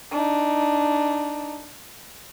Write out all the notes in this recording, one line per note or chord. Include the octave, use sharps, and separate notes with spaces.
D4 D#4